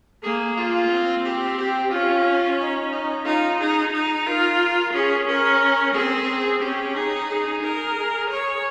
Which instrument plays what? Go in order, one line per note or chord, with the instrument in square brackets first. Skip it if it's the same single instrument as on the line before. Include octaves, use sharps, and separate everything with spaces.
[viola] A#3 [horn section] G#4
[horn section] F4
[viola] C4
[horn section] G4
G4
[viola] C#4 [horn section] F4
[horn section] D#4
D#4
[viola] D#4 [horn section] F4
[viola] D#4 [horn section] G#4
[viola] D#4
[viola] F4 [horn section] A#4
[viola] C#4 [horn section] G#4
[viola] C#4 [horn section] A#4
[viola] C4 [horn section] G#4
[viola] C#4 [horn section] G4
[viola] D#4 [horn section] G#4
[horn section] G#4
[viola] A#4
[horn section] G#4
[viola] C#5